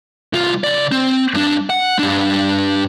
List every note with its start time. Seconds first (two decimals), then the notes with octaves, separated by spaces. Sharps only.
0.33 C2 F4
0.64 C#3 D5
0.92 C4
1.34 G2 D4
1.70 F#5
1.99 G2 D4